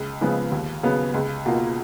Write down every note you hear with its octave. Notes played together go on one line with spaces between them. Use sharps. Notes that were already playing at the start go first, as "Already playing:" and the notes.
Already playing: C#2
C#3 F3 G#3 B3
D#2
C#3 F#3 B3
C#2
B2 A#3 F4